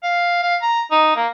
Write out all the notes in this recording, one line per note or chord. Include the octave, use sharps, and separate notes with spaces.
F5
F5
A#5
D#4
A#3